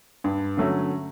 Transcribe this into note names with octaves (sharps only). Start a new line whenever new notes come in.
G2
D3 F#3 A3 C#4